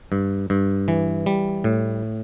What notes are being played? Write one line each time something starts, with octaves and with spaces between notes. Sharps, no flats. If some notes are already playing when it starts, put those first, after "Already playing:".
G2
G2
E3
G3
A2